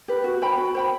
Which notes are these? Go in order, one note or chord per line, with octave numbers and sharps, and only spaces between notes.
G4 B4
F#4
C5 G5 B5
F#4
C5 G5 B5